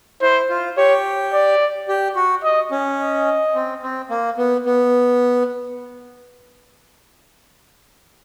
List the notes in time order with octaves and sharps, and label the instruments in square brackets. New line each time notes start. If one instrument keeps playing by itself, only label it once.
[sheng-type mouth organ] E4 [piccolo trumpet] C5
[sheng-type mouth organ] F4
[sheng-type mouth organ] G4 [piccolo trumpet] C#5
[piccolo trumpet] D5
[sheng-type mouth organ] G4
F#4
[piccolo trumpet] D#5
[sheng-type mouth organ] C#4
[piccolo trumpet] D#5
[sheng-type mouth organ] C4
C4
A#3
B3
B3